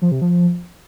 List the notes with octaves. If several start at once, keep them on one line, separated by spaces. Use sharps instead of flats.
F3
C3
F3